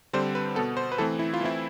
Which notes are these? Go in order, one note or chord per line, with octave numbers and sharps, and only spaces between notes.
D3 G3 C4 C5
B4
B2 B3 A4
C5
B4
E3 A3 C4 A4
E4
F4
E3 A3 C4 E4